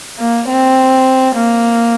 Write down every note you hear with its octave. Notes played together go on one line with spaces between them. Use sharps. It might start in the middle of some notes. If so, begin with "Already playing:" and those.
A#3
C4
A#3